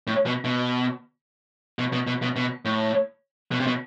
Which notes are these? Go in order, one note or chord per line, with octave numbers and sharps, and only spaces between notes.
A2
B2
B2
B2
B2
B2
B2
B2
A2
B2
C3
B2